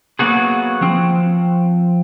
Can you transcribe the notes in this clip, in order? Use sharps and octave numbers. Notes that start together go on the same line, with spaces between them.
F#3 A#3 B3 F#4 G#4
F3 C4